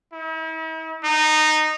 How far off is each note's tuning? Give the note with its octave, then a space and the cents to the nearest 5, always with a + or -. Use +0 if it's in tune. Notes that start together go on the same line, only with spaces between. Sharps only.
E4 -45
D#4 -15